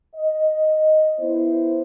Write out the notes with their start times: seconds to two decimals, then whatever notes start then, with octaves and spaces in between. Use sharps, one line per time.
0.14 D#5
1.19 B3 E4 C5